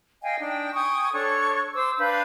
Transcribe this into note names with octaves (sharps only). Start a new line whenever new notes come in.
D#5 F5 G5 G#5
D4 D#4 G5
G5 G#5 C#6 D#6
D4 A4 C#5 C#6
C5 D6 E6
D4 B4 F5 G6